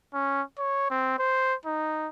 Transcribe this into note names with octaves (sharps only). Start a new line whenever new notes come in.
C#4
C#5
C4
C5
D#4